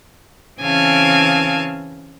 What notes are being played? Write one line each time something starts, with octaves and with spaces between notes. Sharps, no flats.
C#3 E3 C4 F5 G#5 A5